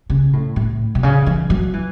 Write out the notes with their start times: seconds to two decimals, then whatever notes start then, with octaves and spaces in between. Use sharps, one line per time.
0.10 C#3
0.33 A2
0.56 A2
0.95 B2
1.03 C#3
1.26 E3
1.50 F#3
1.73 E3